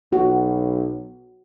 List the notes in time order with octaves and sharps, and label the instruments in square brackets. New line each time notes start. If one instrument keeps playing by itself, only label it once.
[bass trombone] B1 [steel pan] F#4